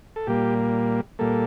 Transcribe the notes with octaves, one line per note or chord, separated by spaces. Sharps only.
A4
A#2 G3 A#3 G4
A#2 G3 A#3 A4